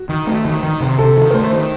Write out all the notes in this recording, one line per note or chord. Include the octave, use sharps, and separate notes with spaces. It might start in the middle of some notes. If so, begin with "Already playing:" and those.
Already playing: F#4
D#3
A3
D#3
D#3
C3
C3 A4
D#3
A#4
A3 C5
D#3